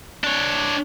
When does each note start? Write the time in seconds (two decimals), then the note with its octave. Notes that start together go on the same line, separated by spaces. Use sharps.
0.24 D4 C#5